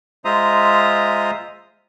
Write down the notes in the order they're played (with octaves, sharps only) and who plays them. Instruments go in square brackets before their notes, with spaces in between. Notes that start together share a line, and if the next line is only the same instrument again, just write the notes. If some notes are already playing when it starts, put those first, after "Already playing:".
[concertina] G#3 F4 C5 E5 A#5 D#6